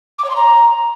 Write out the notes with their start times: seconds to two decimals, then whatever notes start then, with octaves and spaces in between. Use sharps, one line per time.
0.18 D6
0.24 C#5
0.30 C6
0.35 A#5